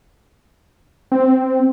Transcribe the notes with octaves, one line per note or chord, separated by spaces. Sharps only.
C4